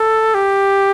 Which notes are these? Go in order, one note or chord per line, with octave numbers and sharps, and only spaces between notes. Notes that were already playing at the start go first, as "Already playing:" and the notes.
Already playing: A4
G4